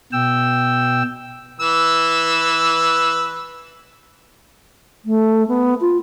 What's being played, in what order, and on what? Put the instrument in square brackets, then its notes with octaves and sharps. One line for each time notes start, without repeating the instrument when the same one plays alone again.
[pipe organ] B2 G5 E6
[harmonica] E3 B4 E6
[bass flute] A3
B3
F4